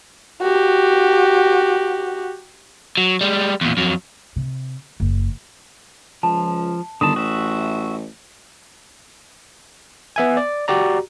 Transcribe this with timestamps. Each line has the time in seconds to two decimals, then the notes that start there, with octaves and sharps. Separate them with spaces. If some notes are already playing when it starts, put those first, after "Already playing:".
0.42 F#4 G4
2.97 F#3
3.21 G3 G#3
3.61 E2 A#2
3.77 F2 F#3
4.36 C3
5.00 F#1
6.23 C#2 F3 A5
7.01 G1 D3 D#3 A5 D#6
7.16 A1 F#4 E5
10.16 B3 E5 G#5
10.37 D5
10.68 F#4 G4 D5 A#5